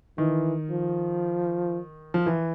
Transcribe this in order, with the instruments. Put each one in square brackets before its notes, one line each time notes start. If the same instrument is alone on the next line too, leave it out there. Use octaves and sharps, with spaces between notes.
[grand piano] D#3 [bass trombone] E3
[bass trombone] F3
[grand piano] F3
E3